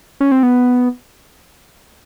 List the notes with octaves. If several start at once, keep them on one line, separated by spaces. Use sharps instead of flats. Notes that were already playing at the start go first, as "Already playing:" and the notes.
C#4
C4
B3